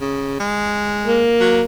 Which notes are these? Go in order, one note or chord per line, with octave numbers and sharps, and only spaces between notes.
C#3
G#3
A#3
F#3